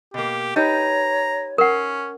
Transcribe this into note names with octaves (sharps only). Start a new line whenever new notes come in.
B2 A#3 G4
D#4 G4 B4 C#5 A#5
C#4 A#4 F#5